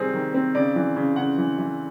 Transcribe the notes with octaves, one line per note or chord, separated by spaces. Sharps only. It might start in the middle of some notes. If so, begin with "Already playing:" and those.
Already playing: C3 D#3 G3 C4 G#4
D#3
C4
C#3 D5
E3
C#3
C#3 F#5
E3
E3